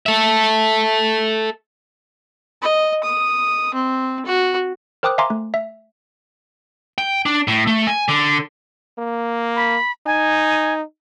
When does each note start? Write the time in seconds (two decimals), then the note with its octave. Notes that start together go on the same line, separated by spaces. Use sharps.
0.06 A4 E5
2.62 D#5
3.04 D#6
3.74 C4
4.26 F#4
5.03 A#4 C5 G5 D6 D#6 F#6
5.18 E5 F5 G#5 A#5 C6 D6
5.30 A3
5.54 E5
6.98 G5
7.26 D4
7.48 A2
7.67 A3
7.87 G#5
8.08 D3
8.99 A#3
9.56 B5
10.06 D#4 G#5